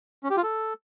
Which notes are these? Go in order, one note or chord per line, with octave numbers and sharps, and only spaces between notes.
C#4
G4
F4
A4